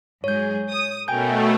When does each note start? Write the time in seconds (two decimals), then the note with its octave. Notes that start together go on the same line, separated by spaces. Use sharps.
0.24 G#2 F#3 G#4 C#5 G6
0.71 D#6
1.08 B2 A3 C#4 A#4 G5 G#5 G6